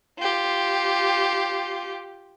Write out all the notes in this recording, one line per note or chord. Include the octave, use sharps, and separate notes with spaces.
F4 G4